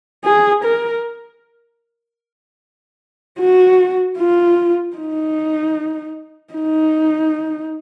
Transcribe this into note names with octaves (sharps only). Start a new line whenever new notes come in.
G#4
A#4
F#4
F4
D#4
D#4